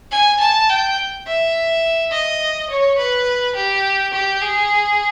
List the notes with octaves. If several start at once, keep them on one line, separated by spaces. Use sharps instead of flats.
G#5
A5
G5
E5
D#5
C#5
B4
G4
G4
G#4